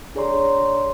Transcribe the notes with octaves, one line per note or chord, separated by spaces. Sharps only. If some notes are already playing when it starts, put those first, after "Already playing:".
D4 G#4 C#5 D5 A#5 C6